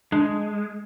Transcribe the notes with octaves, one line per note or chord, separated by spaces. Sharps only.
G#3 D4